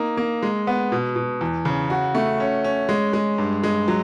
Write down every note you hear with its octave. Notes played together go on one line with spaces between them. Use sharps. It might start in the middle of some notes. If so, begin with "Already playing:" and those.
Already playing: A#3 D#4
A#3
G#3
B3
B2
B2
E2
C#3
F#4
A3
C#4
C#4
G#3
G#3
G2
G#3
F#3